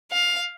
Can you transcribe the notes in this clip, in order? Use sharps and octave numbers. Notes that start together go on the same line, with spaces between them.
F5